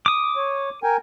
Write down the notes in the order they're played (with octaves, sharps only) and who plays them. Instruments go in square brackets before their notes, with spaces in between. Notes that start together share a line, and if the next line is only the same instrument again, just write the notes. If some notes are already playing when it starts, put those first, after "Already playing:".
[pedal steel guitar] D6 D#6
[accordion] C#5
A#4 G5 G#5